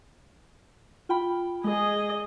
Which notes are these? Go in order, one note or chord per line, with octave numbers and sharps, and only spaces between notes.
F4 G5 B5
G#3 G#4 D#5